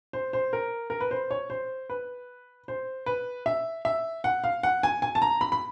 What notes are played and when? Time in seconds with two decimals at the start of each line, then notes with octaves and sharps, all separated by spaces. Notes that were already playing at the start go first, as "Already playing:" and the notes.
0.13 C5
0.33 C5
0.53 A#4
0.90 A#4
1.01 B4
1.11 C5
1.31 C#5
1.50 C5
1.90 B4
2.68 C5
3.06 B4
3.46 E5
3.85 E5
4.24 F#5
4.44 F5
4.63 F#5
4.83 G#5
5.02 G#5
5.15 A5
5.22 A#5
5.41 B5
5.52 B5